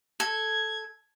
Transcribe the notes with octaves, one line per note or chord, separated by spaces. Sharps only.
A4 G#6